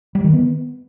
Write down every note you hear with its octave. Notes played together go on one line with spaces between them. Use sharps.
G3
D#3
B3